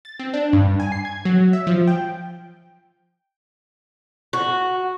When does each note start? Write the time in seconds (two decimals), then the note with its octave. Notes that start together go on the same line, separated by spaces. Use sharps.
0.05 A6
0.20 C4
0.34 D4
0.53 G2
0.80 G#5
0.92 C7
1.05 G#6
1.25 F#3
1.53 E5
1.67 F3
1.88 G5
4.33 F#4